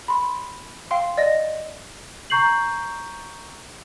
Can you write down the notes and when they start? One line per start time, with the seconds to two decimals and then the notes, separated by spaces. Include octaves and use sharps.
0.08 B5 C6
0.91 F5 G5 C6
1.17 D5 D#5 A#6
2.30 A#5 C#6 G6 C7 F#7